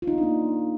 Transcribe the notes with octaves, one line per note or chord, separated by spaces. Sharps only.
F4
D#4
B3
D4
A#3